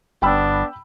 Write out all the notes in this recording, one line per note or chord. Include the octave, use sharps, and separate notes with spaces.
G1 B3 D4 G5 B5 E6